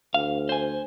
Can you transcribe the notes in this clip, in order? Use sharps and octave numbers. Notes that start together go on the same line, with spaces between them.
D2 F5
C5 G#5